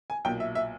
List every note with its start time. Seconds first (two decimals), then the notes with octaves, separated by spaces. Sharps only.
0.10 G#5
0.25 B1 A#2 G5
0.40 E5
0.55 E5